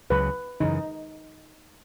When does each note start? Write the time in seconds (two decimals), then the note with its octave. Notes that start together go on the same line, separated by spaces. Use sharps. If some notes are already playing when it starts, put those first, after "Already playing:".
0.10 C#2 C#3 F#3 B4
0.60 F#2 C#3 E3 D#4